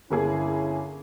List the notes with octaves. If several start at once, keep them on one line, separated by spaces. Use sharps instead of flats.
G1 A#3 C#4 E4 G#4